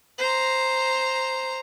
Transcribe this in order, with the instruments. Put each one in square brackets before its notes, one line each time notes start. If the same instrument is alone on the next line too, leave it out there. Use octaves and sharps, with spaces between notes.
[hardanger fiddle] C5 A#5